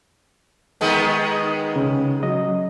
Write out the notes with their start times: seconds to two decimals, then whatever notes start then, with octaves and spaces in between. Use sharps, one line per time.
0.81 D#3 G#3 B3
1.76 C#3 C#4
2.23 F#3 D#5